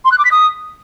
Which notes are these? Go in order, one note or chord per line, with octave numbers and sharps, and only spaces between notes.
C6
F#6
D6
B6
D#6